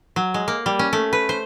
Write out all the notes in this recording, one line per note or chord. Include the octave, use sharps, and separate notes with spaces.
F#3
G#3
A#3
G3
C#4
A3
B4
C5